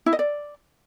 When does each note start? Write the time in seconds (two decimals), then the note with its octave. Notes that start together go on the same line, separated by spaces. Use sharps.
0.06 E4
0.13 D#5
0.19 D5